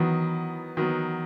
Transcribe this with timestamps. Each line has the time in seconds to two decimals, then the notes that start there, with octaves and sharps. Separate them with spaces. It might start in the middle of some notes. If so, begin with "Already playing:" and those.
Already playing: D#3 E3 F#3 B3
0.77 D#3 F#3 B3